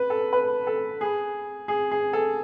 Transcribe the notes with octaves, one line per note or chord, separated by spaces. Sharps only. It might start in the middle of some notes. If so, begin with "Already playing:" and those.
Already playing: B4
A4
B4
A4
G#4
G#4
G#4
A4